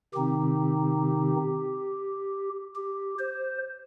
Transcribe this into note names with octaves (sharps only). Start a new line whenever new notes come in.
C3 D#3 C4 D#4 G4
G4
C5